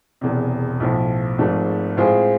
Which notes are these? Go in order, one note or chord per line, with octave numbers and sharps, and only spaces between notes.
E1 E2 C3
B1 A2 F3
G#1 G#2 F3 A3
A2 G#3 C4 F4 G#4